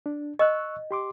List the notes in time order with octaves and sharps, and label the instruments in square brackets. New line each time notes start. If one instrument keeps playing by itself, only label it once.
[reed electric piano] D4
[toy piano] D#5 [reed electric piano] C#6 E6 F#6
[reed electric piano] G4 C6 D6